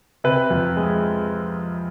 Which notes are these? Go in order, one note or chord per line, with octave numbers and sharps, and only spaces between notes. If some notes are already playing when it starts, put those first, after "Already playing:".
C3 B4
F2
G#3